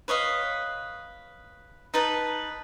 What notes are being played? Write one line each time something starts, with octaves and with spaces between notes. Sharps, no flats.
B4 C#5 D#5 F5
D#4 B4 A5